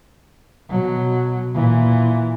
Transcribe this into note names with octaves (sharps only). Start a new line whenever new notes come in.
B2 F#3
A#2 E3